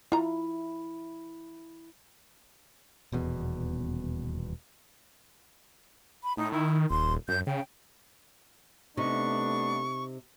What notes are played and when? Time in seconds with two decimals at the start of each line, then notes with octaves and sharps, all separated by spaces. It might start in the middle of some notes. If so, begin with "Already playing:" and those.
0.12 E4 F4 A#5
3.12 D#1 E2 B2
6.23 B5
6.37 A2 D#4
6.52 D#3 E4
6.90 D#1 C6
7.28 F#2 G6
7.47 C#3 G5
8.97 C3 A3 B3 D4 D#4 C#6